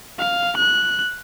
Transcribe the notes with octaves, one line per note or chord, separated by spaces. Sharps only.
F5
F#6